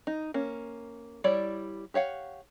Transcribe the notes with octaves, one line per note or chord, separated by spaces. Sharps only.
D#4
A#3 C#4
G3 E4 C#5 D5
G4 C#5 F5 F#5